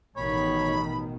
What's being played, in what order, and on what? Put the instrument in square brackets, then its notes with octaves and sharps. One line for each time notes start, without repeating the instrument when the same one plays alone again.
[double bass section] A1 B2 D#3 [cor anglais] C#5 [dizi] B5